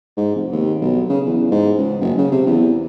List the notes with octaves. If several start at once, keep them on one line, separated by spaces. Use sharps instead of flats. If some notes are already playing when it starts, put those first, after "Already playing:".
G#2
F1
D#2
B1
C#3
E2
G#2
C#2
F#1
C#3
C3
E2